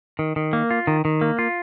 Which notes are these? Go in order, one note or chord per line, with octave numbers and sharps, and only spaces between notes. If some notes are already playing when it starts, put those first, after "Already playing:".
D#3
D#3
A#3
F4
D#3
D#3
A#3
F4